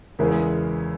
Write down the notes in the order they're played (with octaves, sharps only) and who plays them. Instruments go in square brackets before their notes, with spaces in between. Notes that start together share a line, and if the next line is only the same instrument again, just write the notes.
[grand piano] E2 C#3 G#3 B3 E4 [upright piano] A#4